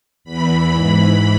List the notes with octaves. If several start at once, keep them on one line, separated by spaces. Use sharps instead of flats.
E2 E3 B5
G#2 E3 B5